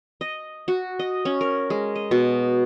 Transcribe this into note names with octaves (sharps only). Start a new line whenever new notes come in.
D#5
F#4
D#5
C#4
A#4
G#3
D#5
B2